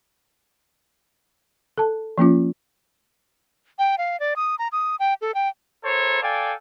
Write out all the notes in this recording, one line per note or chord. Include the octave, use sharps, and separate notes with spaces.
A4 A5
F3 A#3 C#4 F4
G5
F5
D5
D#6
A#5
D#6
G5
A4
G5
E4 A4 A#4 C5 C#5
A4 D5 F5 G5 G#5